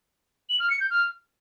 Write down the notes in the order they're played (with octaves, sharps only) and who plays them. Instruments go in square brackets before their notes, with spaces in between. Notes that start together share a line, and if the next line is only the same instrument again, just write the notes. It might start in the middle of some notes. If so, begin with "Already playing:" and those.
[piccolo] F#7
F6
C#7
G6
F6